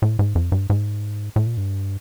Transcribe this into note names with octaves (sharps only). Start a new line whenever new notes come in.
A2
G#2
F2
G2
G#2
A2
A#2
G2